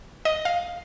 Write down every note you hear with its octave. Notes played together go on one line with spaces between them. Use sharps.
D#5
F5